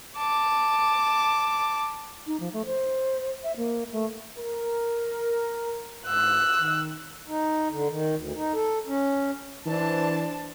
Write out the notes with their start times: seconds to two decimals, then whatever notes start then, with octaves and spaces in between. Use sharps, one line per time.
0.17 A5 D6
2.27 D#4
2.40 F3
2.53 A3
2.66 C5
3.44 E5
3.57 A#3
3.93 A3
4.38 A#4
6.07 G#2 E6 F#6
6.60 D#3
7.28 D#4
7.71 D3
7.90 D#3
8.16 D2
8.36 D#4
8.53 A4
8.87 C#4
9.66 E3 D4 C5 A5